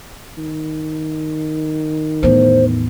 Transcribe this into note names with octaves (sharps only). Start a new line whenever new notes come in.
D#3
E2 A2 C5